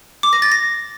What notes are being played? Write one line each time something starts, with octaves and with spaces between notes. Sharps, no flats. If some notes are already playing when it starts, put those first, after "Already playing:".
D6
A#6
A6
A#6